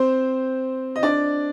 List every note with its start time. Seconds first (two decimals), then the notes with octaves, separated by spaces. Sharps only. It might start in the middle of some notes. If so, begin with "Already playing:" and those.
Already playing: C4 C5
0.96 D#5
1.03 D4 D5